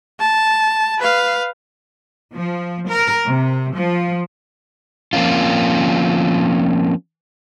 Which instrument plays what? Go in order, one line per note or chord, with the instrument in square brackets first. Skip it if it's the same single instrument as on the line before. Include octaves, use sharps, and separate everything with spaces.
[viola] A5
B4 F5
[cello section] F3
A#4
C3
F3
[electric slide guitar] F3 A#3 C4 C#4 F4